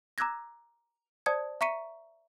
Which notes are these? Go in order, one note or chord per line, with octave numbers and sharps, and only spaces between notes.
A#5 D6 E6 F#6 G#6 A#6
C5 D5 A5 D#6 G#6 C#7
E5 A#5 C#6 B6 C#7 D#7